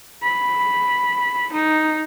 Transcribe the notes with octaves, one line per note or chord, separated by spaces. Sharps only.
B5
D#4